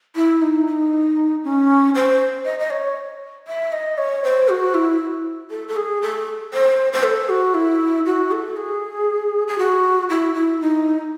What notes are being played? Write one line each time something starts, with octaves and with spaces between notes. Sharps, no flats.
E4
D#4
D#4
C#4
C5
D#5
D#5
C#5
E5
D#5
C#5
C5
F#4
E4
A4
A4
G#4
A4
C5
C5
A4
F#4
E4
F#4
A4
G#4
G#4
F#4
E4
E4
D#4